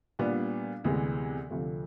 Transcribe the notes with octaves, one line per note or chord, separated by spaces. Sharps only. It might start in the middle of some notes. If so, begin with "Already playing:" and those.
A#2 G3 B3 D4
D2 C3 E3 G#3 B3
D2 C3 F3 A3